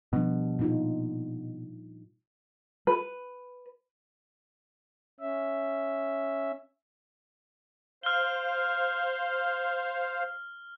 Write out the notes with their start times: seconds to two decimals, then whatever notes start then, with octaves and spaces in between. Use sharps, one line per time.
0.13 B2 F3 G3 D4
0.59 A#2 D#4 F4
2.87 B4
5.20 C#4 E5
8.03 C5 F5 F6 G7